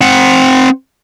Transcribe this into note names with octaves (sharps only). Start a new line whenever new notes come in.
C4 F#5